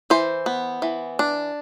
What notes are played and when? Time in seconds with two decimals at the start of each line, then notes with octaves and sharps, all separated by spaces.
0.10 E3 C5
0.46 B3
0.82 E3
1.19 D4